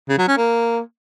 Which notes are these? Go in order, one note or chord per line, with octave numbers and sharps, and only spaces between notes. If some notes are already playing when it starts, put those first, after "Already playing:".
C#3
F#3
C#4
A#3